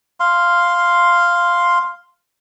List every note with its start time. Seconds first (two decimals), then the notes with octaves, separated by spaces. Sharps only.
0.20 F5 C6